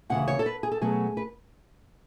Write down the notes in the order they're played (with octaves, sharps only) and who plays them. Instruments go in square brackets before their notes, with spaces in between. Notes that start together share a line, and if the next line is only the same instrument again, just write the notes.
[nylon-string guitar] D2 C#3 E3 F#5
C#5
A4
B4
G#4
A4
B2 F#3 A3 C#4 G#4
B4